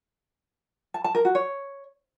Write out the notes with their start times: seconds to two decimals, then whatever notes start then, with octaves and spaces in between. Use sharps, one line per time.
0.94 A5
1.04 A5
1.15 A#4
1.25 F#4
1.35 C#5